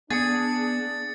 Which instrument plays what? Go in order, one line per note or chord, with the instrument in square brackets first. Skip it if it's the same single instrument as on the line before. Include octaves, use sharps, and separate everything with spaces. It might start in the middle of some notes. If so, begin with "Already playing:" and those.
[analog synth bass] B3 [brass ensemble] D4 [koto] G#4 [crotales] A6 C#7